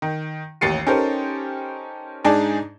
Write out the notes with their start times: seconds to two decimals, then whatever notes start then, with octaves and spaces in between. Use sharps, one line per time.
0.02 D#3
0.61 A1 D#2 A6 C7 C#7 D#7
0.87 C#4 D#4 G4 A4 A#4 C5
2.24 G#2 D4 D#4 G#4 D5 A5